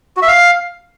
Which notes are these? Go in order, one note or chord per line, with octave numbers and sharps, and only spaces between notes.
F#4
E5
F5